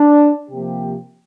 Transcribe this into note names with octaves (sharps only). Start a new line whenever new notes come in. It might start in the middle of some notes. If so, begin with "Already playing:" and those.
Already playing: D4
C3 F3 A#3 G4